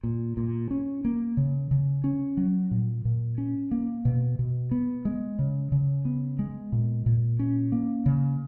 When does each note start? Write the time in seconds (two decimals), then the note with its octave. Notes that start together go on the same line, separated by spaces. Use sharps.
0.03 A#2
0.37 A#2
0.71 C#4
1.05 A#3
1.37 C#3
1.71 C#3
2.04 C#4
2.37 F#3
2.71 A#2
3.05 A#2
3.38 C#4
3.71 A#3
4.05 B2
4.39 B2
4.71 B3
5.05 G#3
5.39 C#3
5.72 C#3
6.05 B3
6.39 G#3
6.72 A#2
7.06 A#2
7.39 C#4
7.72 A#3
8.06 C#3